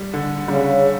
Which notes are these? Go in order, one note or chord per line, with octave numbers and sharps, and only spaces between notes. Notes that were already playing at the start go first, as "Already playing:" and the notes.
Already playing: G3
D3
C#3 G3